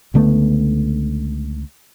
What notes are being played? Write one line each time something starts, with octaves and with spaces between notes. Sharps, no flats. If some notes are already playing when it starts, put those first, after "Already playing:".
C#2 D3 A3 B3